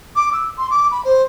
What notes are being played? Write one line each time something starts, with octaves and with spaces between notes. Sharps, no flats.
D6
E6
C6
D6
B5
C5